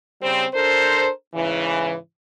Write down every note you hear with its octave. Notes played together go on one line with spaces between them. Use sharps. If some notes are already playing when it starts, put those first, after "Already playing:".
C#3 G3 C4
D4 A4 A#4 C5
G#2 C#3 E3